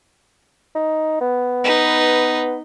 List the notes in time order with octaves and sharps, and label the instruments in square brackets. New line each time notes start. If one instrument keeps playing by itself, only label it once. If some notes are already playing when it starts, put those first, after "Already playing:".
[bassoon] D#4
B3
[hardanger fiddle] D#4 B4